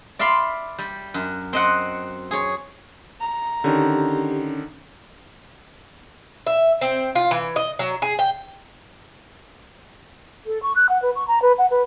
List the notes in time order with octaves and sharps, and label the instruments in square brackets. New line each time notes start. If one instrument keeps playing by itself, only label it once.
[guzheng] D5 E5 F5 B5 C6
G3
F#2
C4 D#5 F#5
G#4 C#5
[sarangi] A#5
[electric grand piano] D3 D#3 [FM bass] C#4 [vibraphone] G4
[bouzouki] E5
C4
F4
E3
D#5
F#3
G#4
G5
[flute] A4
C#6
F#6
F#5
B4
C#6
A#5
B4
F#5
B4